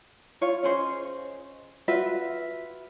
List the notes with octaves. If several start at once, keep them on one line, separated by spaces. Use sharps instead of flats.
F4 C#5 F5
C#4 G#4 C5 D#5
F4 F#4 B4 E5